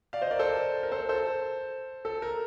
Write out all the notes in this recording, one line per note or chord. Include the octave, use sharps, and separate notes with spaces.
D5 F5
C5 D#5
A#4 D5
A4 C5
A#4
A4 C5
A4 C5
A4
A#4